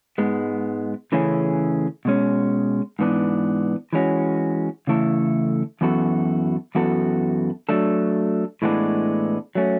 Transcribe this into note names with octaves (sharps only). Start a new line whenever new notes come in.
G#2 G#3 B3
C#3 E3 A3 C#4 G#4
B2 G#3 C#4
G#2 E3 B3 D4
E3 G#3 C#4 F#4
C#3 E3 A3 E4 A4
F#2 E3 B3 F#4 A4
F#2 E3 B3 F#4 A4
F#3 A3 D4 A4
A2 E3 G#3 B3 D4
F#3 A3 C#4